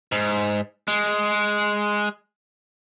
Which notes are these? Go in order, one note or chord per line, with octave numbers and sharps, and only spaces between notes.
G#2
G#3